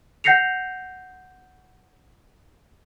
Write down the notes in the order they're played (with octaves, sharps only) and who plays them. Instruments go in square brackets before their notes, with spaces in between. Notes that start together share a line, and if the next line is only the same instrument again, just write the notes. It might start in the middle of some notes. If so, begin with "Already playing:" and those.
[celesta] F#5 G6 A#6 C7 C#7 F7